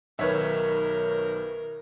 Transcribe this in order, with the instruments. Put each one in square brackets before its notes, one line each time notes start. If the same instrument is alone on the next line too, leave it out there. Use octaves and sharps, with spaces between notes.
[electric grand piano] B1 D#3 [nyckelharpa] A#4 [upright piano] B4 C#5 E5